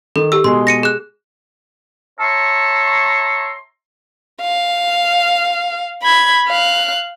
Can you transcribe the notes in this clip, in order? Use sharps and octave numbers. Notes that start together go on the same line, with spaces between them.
D#3 A4
G4 E6
B2 G#3 C6
A#6 C#7 D#7
G#4 F#6
C#5 E5 A5 A#5 C6 C#6
F5
B5 G#6
F5 F#6